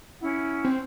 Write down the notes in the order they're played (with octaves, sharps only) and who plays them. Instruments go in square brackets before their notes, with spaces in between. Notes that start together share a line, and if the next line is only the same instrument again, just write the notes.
[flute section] C#4 E4 F#5
[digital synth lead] C4